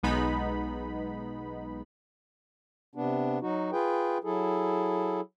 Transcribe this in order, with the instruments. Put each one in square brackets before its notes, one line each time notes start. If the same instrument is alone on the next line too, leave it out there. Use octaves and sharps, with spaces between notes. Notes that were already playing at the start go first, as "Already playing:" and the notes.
[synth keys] B1 G#3 B3 D#4 B5
[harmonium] C3 B3 D4
F#3 D#4 F#4
F4 G#4 B4 G5
F#3 E4 G#4 A4